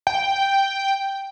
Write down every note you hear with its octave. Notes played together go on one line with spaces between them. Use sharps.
G5